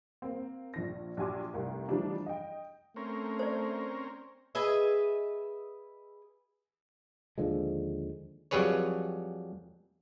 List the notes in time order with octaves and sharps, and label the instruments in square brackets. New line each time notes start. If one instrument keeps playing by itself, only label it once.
[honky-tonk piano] A#3 C4
A#1 F3 A#6
A#1 F#3 G4 G#5 C6 D6
F1 C2 A#4
E3 F3 G3 A3 D4 D#4
D#5 G5
[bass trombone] A3 [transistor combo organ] C4 C#4 A#4
[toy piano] C5 D5
[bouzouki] G#4 B4 D#5 E5
[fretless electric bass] D#2 D3 F3 G#3
[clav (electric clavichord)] F2 F#3 G3 G#4 B4 C#5